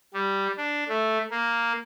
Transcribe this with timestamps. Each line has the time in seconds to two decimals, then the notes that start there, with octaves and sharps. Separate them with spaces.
0.14 G3
0.57 D4
0.89 A3
1.31 A#3